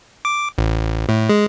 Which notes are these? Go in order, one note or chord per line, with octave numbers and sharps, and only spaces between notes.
D6
A1
A2
G#3